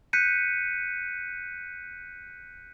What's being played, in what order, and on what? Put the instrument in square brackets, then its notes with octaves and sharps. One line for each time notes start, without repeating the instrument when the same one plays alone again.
[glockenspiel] F#6 G6 B6 C#7 D#7